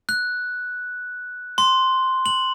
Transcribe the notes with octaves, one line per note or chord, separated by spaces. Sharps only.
F#6
C6
F#7